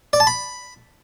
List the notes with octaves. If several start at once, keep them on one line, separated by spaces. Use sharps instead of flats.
D5
A5
B5